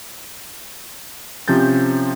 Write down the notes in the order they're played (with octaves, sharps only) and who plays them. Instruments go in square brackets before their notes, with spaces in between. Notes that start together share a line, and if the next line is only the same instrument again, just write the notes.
[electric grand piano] C3 F3 C#4 G6 A6